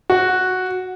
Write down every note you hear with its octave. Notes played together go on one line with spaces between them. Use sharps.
F#4